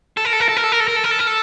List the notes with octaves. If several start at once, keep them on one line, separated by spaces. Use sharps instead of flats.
A4
A#4
A4
A#4
A4
A#4
A4
A#4
A4
A#4
A4
A#4
A4
A#4
A4